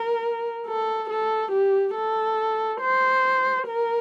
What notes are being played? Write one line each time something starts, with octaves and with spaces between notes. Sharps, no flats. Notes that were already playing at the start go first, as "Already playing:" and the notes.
Already playing: A#4
A4
A4
G4
A4
C5
A#4